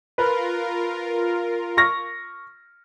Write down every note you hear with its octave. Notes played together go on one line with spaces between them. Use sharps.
F4 A#4 B4
C#6 F6 A#6